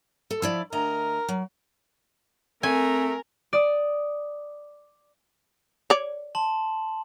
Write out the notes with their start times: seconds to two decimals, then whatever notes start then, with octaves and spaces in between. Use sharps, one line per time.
0.31 A4
0.42 F3 E4 D5
0.72 D2 A#4 D#5 A#5
1.29 F#3
2.63 A3 C4 A#4 G#5
3.53 D5 D#6
5.90 C#5 D5
6.35 A5 C6 F#7